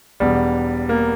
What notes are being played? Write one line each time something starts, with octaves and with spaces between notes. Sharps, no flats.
E1 E2 B2 G3
A#3